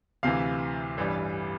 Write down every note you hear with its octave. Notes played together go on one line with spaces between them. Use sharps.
D2 C3 E3 F5
A1 G2 E3 G3